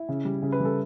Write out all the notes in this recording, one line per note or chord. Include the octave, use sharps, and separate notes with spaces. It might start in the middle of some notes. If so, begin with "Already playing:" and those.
Already playing: E4
C#3
G3
C#3
B4
G3 A4